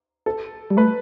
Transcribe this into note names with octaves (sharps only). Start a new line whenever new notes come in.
A4
G3
A3 B4